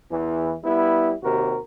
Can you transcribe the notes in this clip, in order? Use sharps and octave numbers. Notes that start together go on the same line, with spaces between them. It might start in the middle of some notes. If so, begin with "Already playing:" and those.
E2 E3
G3 B3 E4
D#2 C3 F#4 A#4